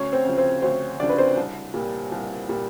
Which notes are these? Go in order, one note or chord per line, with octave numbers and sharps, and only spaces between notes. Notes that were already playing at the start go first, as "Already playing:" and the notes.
Already playing: D2 C#4 C#5
C4 C5
C#3 F3
C4 C5
D2 C4 C5
C#3 F3 D4 D5
B4
C4 C5
C2
A#2 G3
C2
A#2 G3